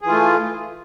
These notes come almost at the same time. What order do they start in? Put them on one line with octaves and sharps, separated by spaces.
G#4 E3 F4 A3